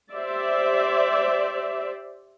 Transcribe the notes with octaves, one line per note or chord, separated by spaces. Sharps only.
G4 C5 D5 E5